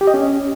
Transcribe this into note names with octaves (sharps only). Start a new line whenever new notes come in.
G4
D#5
C#4